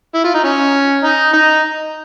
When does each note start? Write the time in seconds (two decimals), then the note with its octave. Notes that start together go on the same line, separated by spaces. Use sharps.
0.15 E4
0.25 F4
0.35 D#4
0.44 C#4
1.04 D#4
1.33 D#4